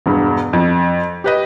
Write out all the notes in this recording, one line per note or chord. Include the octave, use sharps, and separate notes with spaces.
E1 G2
F2
G4 B4 D#5